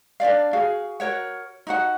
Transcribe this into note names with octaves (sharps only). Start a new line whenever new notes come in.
D4 F4 D5 F5
F#4 G#4 F5
F#4 A#4 C#5 F#5
D#4 F#4 F#5